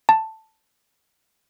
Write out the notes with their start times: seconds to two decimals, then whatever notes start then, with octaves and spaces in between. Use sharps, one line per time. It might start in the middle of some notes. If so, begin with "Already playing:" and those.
0.09 A5